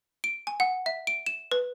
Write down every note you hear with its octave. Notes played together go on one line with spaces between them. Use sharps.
D7
G#5
F#5
E5
D7
E7
B4